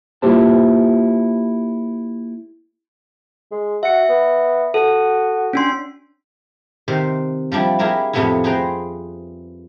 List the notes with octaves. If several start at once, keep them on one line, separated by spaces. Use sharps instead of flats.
A#3 E4 F4 G4 C5 A5
G#3
F#4 E5 C#7
B3
F#4 A4
C#4 D4 C6
C3 D#3 C5
F3 G3 D4 E4
E4 G4 G#4 A#4 E5
F2 A2 C3 A3 B3 E4
G#4 B4 C5 G5 A#5